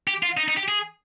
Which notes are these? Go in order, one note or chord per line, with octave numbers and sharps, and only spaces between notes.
G4
F4
D#4
D#4
G4
G#4